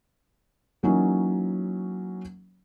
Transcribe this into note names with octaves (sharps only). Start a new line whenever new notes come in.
E3 F#3 A#3 C#4 D#4